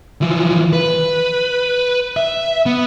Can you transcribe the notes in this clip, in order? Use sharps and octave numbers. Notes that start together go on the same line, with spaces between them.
E3 F3
B4
E5
B3